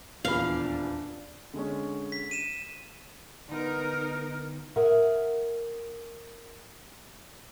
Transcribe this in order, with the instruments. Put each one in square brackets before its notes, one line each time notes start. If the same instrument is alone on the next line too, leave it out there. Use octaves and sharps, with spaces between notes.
[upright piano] D#1 E2 B5 [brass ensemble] D4 [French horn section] F4 [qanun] F5
[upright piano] D3 G#3 C#4
[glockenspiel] B6
D#7 E7
[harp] D3 B3 [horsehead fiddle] D#4 A#4
[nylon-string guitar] G#4 A#4 E5 F#5